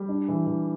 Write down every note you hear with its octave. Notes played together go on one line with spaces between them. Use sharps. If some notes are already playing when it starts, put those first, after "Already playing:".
Already playing: G3
D4
E3
E3